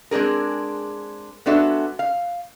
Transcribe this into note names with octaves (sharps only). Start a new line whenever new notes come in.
G#3 C4 D4 G#4 A#4
G#3 B3 D4 F#4 A4 E5
F5